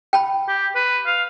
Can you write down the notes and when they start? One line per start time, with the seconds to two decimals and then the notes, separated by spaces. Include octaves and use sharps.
0.13 G5 A5 B5
0.48 G4
0.75 B4
1.06 F5